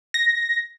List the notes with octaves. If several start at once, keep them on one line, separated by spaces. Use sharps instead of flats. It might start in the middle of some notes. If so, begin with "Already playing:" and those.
A#6